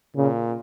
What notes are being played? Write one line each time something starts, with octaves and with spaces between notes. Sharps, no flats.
A#2 C#3